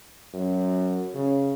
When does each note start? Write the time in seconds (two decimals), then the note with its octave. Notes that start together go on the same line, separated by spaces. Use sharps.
0.34 F#2
1.14 C#3